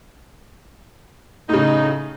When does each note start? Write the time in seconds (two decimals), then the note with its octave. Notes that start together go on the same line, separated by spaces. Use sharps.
1.49 A2 C#3 D#4